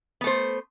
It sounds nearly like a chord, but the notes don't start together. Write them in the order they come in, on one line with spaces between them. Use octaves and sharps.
B3 A3 C5